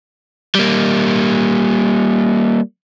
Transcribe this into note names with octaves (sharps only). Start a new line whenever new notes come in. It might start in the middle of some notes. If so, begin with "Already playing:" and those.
G3 A#3